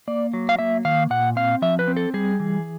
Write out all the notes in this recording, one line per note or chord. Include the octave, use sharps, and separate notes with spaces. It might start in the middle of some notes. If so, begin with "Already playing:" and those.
A#3 D5
F#3
F5
A#3 E5
D#3 F5
A#2 F#5
C4 F5
F3 E5
B4
C4
A4
G3 G#4
E3